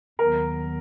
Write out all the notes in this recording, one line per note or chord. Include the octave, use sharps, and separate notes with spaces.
D#2 D#3 F#3 B3 A#4